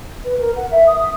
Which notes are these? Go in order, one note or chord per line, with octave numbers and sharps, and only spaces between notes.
B4
A#4
F#5
E5
D#6
D#6